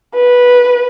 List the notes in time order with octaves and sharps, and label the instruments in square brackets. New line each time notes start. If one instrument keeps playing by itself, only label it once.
[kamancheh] B4